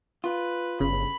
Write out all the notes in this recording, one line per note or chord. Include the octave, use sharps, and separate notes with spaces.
F4 B4
G1 C#3 B5